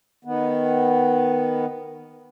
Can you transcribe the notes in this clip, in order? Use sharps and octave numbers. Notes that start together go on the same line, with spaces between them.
D#3 B3